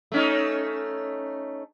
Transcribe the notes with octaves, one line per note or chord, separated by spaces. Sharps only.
A3 C#4 D#4